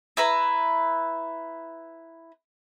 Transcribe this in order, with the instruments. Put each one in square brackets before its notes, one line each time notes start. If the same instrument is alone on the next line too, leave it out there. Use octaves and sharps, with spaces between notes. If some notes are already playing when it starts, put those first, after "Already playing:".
[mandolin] E4 B4 A#5